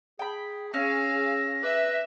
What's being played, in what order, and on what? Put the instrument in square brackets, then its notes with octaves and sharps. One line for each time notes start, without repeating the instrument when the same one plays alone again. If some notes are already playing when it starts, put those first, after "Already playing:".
[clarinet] G#4 [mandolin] G5 B5
[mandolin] C#4 [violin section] G#4 F5 [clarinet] E6 [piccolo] A#6
[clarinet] B4 [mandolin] D5 [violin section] E5